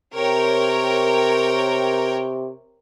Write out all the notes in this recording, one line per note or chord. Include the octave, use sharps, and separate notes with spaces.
C3 A#4 C#5 G5